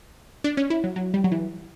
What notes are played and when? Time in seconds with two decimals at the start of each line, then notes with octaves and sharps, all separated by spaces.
0.44 D4
0.57 C#4
0.70 E4
0.84 F#3
0.96 F#3
1.14 G3
1.24 F#3
1.32 E3